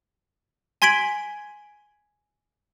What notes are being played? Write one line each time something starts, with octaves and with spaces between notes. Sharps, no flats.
G#5 C6 G#6 B6 D7 F#7